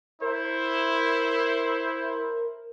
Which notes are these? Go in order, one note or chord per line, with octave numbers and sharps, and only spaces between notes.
E4 A#4 C5